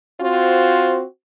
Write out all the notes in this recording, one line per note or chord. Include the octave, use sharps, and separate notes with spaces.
C4 F4 F#4 C5